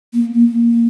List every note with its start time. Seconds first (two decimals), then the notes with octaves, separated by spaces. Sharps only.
0.13 A#3
0.35 A#3